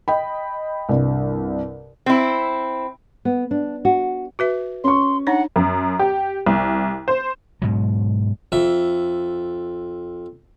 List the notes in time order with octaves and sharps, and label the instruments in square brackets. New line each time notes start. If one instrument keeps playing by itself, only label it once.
[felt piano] D#5 G5 B5
C2 G2
[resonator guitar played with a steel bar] C4 E4
[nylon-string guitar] B3
D4
F#4
[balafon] F#4 B4 E5
[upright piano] C#4 C#6 [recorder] C6
[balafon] D4 D#4 C#5 [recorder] F#5
[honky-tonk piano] F#2
G4
C2
C5
[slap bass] G#2 B2 F#3
[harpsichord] F2 E5